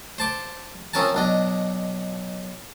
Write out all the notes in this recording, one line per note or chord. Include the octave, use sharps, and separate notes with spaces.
C5 A5 D6
F3 C4 C#4 A#4 G#5 A5
B1 D4 D#5